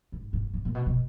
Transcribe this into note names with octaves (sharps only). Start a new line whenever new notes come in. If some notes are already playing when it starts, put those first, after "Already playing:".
G#2
G#2
G#2
A#2
B2
B2